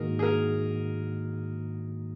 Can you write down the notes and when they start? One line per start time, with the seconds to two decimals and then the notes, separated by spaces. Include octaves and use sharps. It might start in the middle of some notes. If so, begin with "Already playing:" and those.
Already playing: G#2 D#3 A#3 D#4 F#4 G#4 A#4
0.19 G#4
0.23 A#4